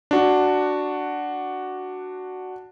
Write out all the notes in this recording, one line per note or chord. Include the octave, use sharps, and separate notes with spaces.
D4 F#4